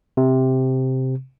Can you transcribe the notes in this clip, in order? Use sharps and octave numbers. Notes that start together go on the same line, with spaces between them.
C3